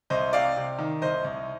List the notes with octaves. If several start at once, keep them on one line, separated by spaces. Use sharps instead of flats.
C2 C5 D#5
C3 D5 F5
C3
D#3
C2 C5 D#5
C2